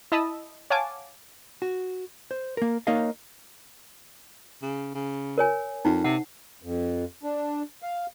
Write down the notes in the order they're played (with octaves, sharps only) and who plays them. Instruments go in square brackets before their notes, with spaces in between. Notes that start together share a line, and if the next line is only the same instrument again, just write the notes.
[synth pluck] E4 D#5 A5 B5 D#6 E6
C#5 F5 F#5 G#5 A5 D6
[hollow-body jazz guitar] F#4
C5
A#3 A#4
A#3 D#4 A#4 C#5 D#5 F5
[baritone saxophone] C#3
C#3
[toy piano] A#4 C#5 G#5
[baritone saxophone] F2 [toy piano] D#4
[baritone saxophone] C3 [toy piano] F#5
[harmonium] F2
D4
F5